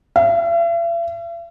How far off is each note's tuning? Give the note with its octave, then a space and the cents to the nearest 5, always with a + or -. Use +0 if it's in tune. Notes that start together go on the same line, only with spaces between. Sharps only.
E5 +45